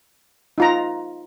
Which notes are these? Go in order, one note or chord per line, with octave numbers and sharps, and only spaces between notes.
D#4 F4 A#5